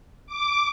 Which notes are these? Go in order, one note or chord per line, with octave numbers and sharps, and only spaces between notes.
D6